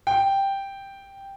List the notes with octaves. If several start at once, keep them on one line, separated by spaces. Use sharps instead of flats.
G5